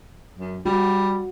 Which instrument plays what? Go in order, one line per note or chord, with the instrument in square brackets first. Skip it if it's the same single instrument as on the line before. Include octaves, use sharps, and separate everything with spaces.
[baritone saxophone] F#2
[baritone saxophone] G3 [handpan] F#4